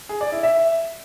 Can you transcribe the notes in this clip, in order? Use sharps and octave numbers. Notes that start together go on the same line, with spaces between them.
G#4
D5
E4
E5